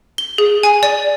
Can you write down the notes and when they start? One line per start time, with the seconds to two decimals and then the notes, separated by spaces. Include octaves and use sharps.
0.18 G7
0.38 G#4
0.63 G#5
0.83 D5